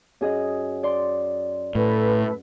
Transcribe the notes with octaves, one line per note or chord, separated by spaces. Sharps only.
F#2 G#4 D#5
D5 C6
A2 A4 B4